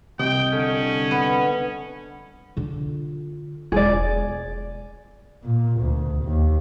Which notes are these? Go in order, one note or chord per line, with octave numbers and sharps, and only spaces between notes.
C2 D#5 G5
D3 C#4
B3
D3 F4
E1 G#3 G#4 D5
A#2
D2
D#2